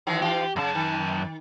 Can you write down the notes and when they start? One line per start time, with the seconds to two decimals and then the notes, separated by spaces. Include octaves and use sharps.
0.07 D#3 E3 F#3
0.22 E3 F4 G4
0.56 F#2 C#3 A5
0.75 D#3